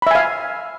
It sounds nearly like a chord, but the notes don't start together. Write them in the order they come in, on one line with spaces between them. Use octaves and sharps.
B5 E5 G#5 F5